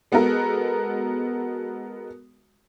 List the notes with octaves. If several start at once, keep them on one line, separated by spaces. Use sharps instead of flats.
G#3 B3 F#4 A4 A#4